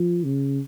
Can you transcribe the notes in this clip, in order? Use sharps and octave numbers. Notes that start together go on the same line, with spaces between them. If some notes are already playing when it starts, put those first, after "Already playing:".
Already playing: F3
C#3